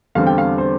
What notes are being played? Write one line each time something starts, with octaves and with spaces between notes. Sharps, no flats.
E2 D3 G3 C4 F5
G5
F5
C5